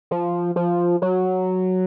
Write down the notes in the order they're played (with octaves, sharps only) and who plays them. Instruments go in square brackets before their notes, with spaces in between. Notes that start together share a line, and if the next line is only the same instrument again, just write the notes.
[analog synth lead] F3
F3
F#3